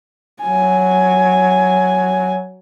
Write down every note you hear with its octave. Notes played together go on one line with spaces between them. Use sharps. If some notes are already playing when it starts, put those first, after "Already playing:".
F#3 G#5